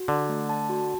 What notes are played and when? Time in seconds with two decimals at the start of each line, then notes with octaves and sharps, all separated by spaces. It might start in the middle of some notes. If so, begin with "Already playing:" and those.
Already playing: F#4
0.08 D3 D5
0.29 A3
0.49 A5
0.69 F#4